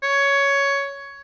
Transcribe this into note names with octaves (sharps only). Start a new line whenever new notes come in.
C#5